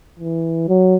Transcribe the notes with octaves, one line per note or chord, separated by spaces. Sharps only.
E3
F#3